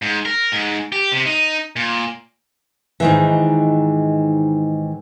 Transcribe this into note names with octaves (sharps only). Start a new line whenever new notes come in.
G#2
A#4
G#2
G4
C3
D#4
A#2
G#2 D#3 E3